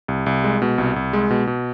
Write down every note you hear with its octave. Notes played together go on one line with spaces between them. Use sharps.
C2
C2
G#3
B2
C2
C2
G#3
B2
B2